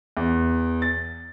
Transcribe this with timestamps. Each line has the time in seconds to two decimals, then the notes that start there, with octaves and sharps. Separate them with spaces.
0.17 E2
0.82 A6